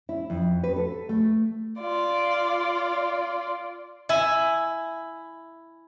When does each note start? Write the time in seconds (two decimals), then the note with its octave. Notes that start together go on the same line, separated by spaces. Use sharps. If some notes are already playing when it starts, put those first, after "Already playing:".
0.09 E4
0.30 F2
0.64 B4
0.76 A4
1.09 A3
1.80 F4 D5
4.09 E4 E5 G#5